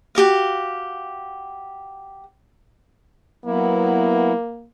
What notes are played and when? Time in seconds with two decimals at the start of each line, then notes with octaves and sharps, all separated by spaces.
0.15 F#4 G4 A#4 F5
3.45 F#3 A#3 B3 E4